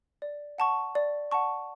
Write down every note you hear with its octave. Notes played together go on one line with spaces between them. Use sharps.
D5
F#5 A5 C#6
D5
F#5 A5 C#6